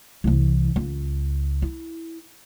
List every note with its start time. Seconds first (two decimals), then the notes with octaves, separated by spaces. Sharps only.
0.24 C2 E3
0.76 C#2
1.62 E4